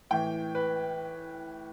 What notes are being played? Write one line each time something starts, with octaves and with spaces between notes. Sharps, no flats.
A2 E3 G5
B4